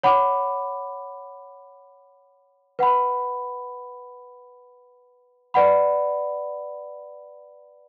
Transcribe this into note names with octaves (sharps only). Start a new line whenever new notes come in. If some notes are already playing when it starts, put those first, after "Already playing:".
C#5 F#5 B5 D6
B4 F#5 B5
B4 D5 F#5 B5